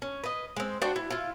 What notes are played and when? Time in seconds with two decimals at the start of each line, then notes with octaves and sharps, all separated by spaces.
0.02 C#4
0.24 B4 D#5
0.57 G#3 C4
0.82 D4 F#4 C5 G5
0.96 E4
1.11 E4 F4